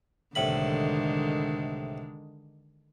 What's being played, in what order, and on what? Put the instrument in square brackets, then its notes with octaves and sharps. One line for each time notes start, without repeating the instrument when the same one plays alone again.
[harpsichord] C2 A2 B5 [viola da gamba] D3 D#3 G#3